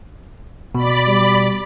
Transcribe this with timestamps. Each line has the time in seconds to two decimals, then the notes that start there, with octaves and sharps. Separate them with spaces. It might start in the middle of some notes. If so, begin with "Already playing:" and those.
0.75 B2 D5 B5
1.07 G3